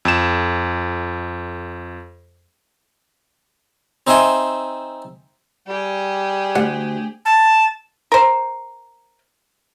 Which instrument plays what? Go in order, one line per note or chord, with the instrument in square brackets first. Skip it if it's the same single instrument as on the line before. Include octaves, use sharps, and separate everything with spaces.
[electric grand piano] F2 E7
[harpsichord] C4 D#4 C5 E5 G#5 C6
[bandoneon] G3 [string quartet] G4 G#4
[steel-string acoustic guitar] D2 [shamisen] G3 F#5
[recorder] A5
[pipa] A#4 C5